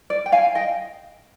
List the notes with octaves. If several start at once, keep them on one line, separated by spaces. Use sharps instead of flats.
D5
G5
F5 G#5
D#5 G5